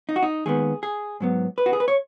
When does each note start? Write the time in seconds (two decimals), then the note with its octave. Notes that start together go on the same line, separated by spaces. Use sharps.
0.09 D#4
0.16 F#4
0.22 D#4
0.45 D#2 D#3 G#3 B3 G#4
0.83 G#4
1.20 G#2 F#3 B3
1.58 B4
1.66 F#4
1.73 G#4
1.80 B4
1.88 C#5